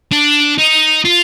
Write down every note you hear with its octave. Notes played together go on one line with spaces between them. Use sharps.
D4
D#4
F4